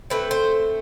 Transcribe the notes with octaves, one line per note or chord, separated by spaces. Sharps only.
D3 A3 C4 B4
C5